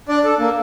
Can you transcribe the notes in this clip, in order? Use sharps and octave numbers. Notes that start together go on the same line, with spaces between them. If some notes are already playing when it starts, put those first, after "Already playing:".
D4 D5
A4
A#3